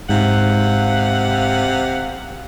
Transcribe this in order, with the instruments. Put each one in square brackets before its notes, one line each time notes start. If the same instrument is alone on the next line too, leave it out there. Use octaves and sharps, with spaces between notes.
[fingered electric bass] G#2 [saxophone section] C3 F5 F#5